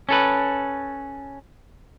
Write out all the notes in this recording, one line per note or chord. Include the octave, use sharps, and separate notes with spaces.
C#4 A4 B4